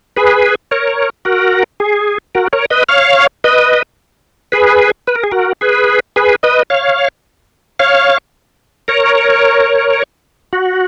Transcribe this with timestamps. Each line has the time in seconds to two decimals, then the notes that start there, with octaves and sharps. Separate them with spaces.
0.17 G#4 B4
0.71 A#4 C#5
1.25 F#4 A#4
1.80 G#4
2.35 F#4 A#4
2.53 A#4 C#5
2.70 B4 D#5
2.89 C#5 F5
3.44 B4 D#5
4.52 G#4 B4
5.07 B4
5.15 A#4
5.23 G#4
5.31 F#4 A#4
5.61 G#4 B4
6.16 G#4 B4
6.43 B4 D#5
6.70 C#5 F5
7.79 C#5 F5
8.88 A#4 C#5
10.53 F#4